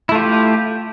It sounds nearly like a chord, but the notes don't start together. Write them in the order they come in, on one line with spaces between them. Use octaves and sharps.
E4 A3 F4 G4